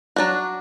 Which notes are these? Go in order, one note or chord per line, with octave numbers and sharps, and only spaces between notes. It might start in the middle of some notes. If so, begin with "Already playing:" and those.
F#3 D4 F#4